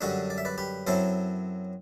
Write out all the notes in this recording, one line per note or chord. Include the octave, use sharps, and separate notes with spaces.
F#2 D3 G3 D4 F#4 A4
D5
E5
B4 D5
G4 B4
F#2 F#3 C4 E4 A4 C5